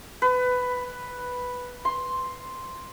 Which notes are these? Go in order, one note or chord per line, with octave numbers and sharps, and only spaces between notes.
B4
C6